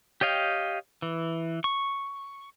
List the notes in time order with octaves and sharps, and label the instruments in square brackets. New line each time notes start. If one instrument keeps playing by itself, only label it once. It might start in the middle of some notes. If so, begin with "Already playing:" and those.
[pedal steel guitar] G4 C#5 D#5 F5 G5
E3
C#6